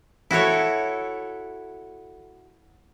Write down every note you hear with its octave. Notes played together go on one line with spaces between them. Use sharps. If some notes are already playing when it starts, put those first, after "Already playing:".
E4 F#4 A4 C#5